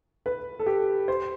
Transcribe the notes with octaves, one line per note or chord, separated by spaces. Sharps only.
B4
A4
G4
C5